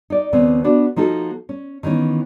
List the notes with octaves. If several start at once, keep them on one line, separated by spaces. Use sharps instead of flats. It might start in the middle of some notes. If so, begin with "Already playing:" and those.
D#4 D5
D#2 C#3 B3 C4
B3 D4 F#4
F3 A#3 D#4 F#4 A4
C#4
D#3 E3 B3 C#4